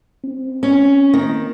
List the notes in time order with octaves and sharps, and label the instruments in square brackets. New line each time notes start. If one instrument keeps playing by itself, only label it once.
[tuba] C4
[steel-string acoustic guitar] C#4
[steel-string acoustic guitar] D#3 [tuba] A#3